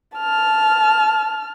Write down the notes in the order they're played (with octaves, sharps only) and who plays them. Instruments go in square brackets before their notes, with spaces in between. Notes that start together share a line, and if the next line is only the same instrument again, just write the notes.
[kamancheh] A5 F6